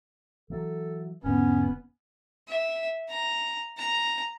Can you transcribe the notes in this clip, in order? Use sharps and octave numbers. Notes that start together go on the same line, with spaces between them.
E3 F#3 A4
E1 G#2 D3 B3 C#4
E5
A#5
A#5